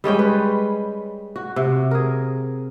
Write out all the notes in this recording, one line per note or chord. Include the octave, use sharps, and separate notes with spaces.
G3 G#3 C#4 G5
B4
F#4
C3
G#4 A#4